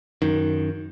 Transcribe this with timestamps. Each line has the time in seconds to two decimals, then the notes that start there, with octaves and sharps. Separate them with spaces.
0.22 F#2 D#3